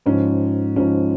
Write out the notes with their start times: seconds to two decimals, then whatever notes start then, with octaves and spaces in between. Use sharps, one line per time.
0.06 G#2 F3 C#4
0.76 G#2 F3 C#4